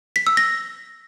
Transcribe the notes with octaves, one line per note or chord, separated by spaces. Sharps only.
B6
E6
A#6